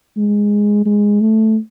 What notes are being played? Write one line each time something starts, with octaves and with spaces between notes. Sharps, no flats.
G#3
G#3
A3